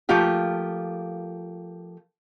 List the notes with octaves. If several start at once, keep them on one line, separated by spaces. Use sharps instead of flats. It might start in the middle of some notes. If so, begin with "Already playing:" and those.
F3 A3 A#3 F4 G4